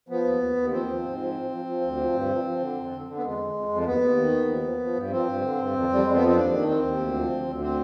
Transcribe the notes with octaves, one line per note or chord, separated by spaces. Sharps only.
F3 B3
D#2
D#2
D#2
F3 C4
F3
G#2
F3
F3
F3
F3
D2
F3
G2
F3
F3
D3
F2
D3
D3
B3
F2 G#3
F2
F2
F2
D#2 B3
D#2
D#3
D#2
F3
F3
F3
G2
F3 C4
G2
D3
G2
F2
F2 G3
F2 G#3
B3
F3 C4
D#2 D4
D#3
D#2 C4
D#2
D2
F3
D2
D2
C4